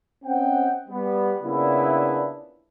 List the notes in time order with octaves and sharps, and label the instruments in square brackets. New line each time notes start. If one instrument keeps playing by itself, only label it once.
[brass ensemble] C4 C#4 D#5 F#5 G5
G3 B3
A#2 C#3 B3 D4 E4